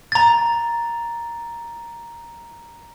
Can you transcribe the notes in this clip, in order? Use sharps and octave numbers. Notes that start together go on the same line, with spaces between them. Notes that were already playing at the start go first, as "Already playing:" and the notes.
A#5 A6